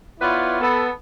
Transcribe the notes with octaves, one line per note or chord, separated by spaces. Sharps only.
B3 E4 F4 B4 C#5 D5
B3 A4